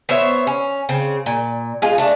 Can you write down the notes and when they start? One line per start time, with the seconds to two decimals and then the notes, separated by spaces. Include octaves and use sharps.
0.09 B3 C5 C#5 E5
0.47 C#4
0.89 C#3 C4
1.26 A#2
1.82 G#3 F4 G#4
1.98 A3 D4